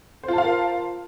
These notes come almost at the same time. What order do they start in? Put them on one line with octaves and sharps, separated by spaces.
C5 F4 A5 F5 A#4